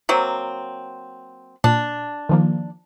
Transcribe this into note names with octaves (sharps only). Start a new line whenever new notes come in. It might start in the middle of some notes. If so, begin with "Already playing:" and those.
F#3 A#3 C4
A#2 D4
D#3 F3 A#3